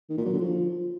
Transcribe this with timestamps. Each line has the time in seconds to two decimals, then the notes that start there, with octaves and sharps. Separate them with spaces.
0.10 D#3
0.18 A#2
0.25 F#3
0.33 D3
0.41 F3